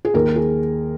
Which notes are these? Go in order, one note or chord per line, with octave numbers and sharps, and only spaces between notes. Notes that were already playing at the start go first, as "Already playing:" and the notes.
G#4
D#2 A#4
G#4